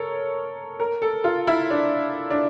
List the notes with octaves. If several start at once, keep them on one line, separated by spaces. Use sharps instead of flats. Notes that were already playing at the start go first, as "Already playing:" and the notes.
Already playing: A4 A#4 C#5
A#4
A4
F4
E4
D4
D4